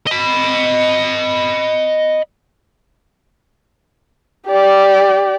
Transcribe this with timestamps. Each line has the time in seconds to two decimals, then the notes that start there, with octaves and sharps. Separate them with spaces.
0.07 D#5 B5
4.48 G4 D5